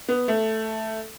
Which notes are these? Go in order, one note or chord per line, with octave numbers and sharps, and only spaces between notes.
B3
A3